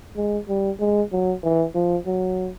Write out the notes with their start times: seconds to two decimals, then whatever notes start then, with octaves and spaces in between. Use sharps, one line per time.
0.17 G#3
0.48 G3
0.80 G#3
1.12 F#3
1.44 E3
1.75 F3
2.06 F#3